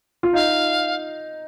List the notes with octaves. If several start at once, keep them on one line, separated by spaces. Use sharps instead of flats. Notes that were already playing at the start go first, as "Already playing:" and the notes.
F4
D#4 F5